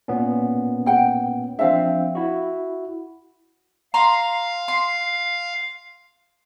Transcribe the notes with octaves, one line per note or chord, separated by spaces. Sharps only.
A#2 B3 C#4
F#5 G5
F3 C4 D4 E5 F5
E4 F#4
F5 A#5 C6
C6